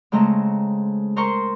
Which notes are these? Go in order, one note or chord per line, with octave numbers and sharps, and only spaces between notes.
C#3 G#3 A3 C4 A#5
A#4 C5 A#5 C6 C#6